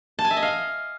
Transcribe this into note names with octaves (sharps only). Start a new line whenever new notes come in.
A5
G#5
E5
D#5
F5